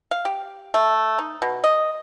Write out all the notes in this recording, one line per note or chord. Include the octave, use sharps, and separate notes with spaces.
F5
G4
A3
D#4
B2
D#5